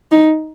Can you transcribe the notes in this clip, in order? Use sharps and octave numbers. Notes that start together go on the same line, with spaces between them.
D#4